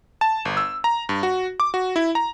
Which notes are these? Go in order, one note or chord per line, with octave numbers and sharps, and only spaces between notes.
A5
G1
E6
A#5
G2
F#4
D6
F#4
E4
A#5